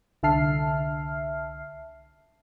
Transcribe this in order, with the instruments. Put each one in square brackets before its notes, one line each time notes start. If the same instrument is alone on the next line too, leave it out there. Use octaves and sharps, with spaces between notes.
[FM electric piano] C2 D3 E5 A5 F6 C7